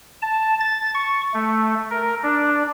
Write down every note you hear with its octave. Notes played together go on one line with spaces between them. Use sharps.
A5
A6
C#6
A3
A#4
D4